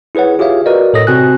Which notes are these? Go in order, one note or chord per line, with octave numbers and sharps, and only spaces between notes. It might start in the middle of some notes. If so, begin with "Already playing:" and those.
E4 G#4 B4 C#5 F#5
F4 G4 G#4 C#5 E5 F5
F#4 A#4 B4 D5 D#5
A2 A4 C#5 D#5 D#6 A#6
C3 C4 F#4 G#5 F#6